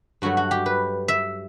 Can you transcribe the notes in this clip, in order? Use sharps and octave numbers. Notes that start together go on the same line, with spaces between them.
G2 F#3 A3 F#4
F#4
G4
B4
E5